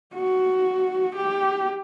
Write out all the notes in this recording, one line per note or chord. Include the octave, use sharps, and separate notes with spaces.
F#4
G4